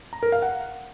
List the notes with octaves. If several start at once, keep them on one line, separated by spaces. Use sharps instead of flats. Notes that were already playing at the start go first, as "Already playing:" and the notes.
A#5
A#4
F5
F#5